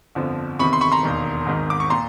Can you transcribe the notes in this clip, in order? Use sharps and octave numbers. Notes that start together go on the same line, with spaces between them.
G1 F2 D3 F3
E2 C3 D#3 B5 C#6
C6
B5 C#6
A#5 C6
E1 D#2 D#3
G#1 G#2 D#3
D6
C#6
A#2 A#5 C6